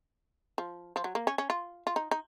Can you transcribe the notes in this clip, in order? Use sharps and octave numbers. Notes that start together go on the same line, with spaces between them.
F3
F3
F#3
A#3
C#4
C#4
F4
F4
D#4
D#4